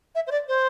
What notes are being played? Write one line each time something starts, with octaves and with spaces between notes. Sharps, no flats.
E5
C5
D5
C5